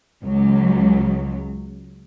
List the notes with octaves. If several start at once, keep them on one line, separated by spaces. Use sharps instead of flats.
C#2 F#3